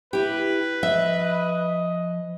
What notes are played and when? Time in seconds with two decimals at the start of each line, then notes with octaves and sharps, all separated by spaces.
0.13 E4 G4 B4
0.83 F3 D#5 E5